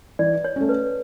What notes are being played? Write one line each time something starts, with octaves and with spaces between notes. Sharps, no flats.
E3 D5
C#5
A3 C#4
B4